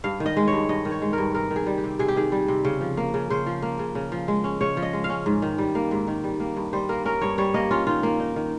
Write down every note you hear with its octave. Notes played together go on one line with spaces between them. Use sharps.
G2 F5
D#3
D#5
G#3
C#5
G2
G2 D#5
D#3
C#5
G#3
A#4
G2
C3 A#4
D#3
G#4
G3
G4
C3
C3 G#4
G4
D#3 G#4
G3
C3
C#3
F3
A#3
C#3
C#3 C5
F3
A#3
C#3
C#3
F3
G#3
C#4
C#3 C#5
F3
D#5
G#3
F5
C#4
G#2
D#3
G3
A#3
G#2
D#3
G3
A#3
G2
G3 C5
A#3 A#4
C#4 A#4
G2 C#5
G3 C#5
A#3 D#5
C#4 F4
D#3 F4
A#3
D#4
D#3